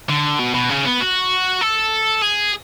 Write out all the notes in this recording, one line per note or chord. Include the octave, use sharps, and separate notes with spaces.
D3
B2
B2
C#3
B3
F#4
A4
G#4